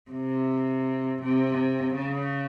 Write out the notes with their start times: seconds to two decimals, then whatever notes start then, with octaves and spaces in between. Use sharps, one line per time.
0.11 C3
1.22 C3
1.95 C#3